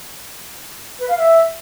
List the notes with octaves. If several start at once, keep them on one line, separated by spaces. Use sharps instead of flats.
B4
F5
E5